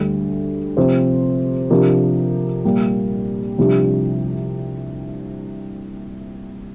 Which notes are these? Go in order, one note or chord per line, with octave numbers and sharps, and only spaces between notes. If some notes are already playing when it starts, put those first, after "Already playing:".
Already playing: D2 D3 G3
C3 F3 C4 G4 C5
C3 F3 D4 G4 A#4
A#2 G3 A#3
C2 C3 F3 D4 G4